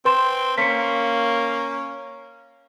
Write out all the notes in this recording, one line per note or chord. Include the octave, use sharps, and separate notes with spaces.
C4 B4 C6 E7
A#3 C#4 B6 C#7